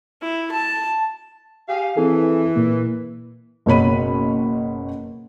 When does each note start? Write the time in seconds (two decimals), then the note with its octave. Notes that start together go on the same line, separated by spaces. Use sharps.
0.22 E4
0.52 A5
1.69 G4 G#4 F5
1.97 E3 C4 G#4 A4
2.56 A#2 A#3
3.66 F#1 B2 C#5 B5 D#7